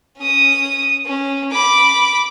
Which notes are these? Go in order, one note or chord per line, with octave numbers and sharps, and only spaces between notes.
C#4 D#6
C#4
B5 D6